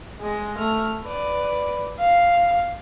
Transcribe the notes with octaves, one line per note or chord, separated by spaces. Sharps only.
G#3
A3 F6
B4 D5
F5